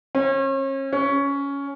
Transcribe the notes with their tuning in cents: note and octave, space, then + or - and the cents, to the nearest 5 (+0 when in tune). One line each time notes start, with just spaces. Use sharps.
C#4 -40
C#4 +10